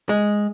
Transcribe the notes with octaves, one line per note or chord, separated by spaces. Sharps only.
G#3